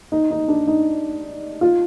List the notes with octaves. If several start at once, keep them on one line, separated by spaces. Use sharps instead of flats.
D#4
D#4
D4
D#4
F4